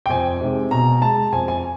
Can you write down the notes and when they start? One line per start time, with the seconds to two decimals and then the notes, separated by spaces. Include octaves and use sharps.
0.06 G5
0.10 F2 G#5
0.41 C3 D#3 G#3
0.71 B2 A#5
1.02 G#3 A5
1.32 F2 G#5
1.48 G#5